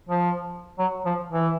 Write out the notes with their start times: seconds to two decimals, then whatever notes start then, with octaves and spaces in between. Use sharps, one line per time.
0.09 F3
0.79 F#3
1.06 F3
1.33 E3